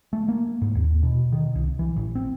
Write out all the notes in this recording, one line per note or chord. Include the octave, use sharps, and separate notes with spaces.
A3
A#3
G#2
D#2
B2
D#3
C2
E3
A1
C4